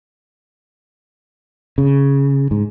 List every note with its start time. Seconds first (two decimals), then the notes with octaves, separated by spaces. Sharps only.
1.78 C#3
2.51 G#2